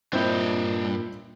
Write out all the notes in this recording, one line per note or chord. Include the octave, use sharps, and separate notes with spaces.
G2 A#2 C4 D4 E4 D#5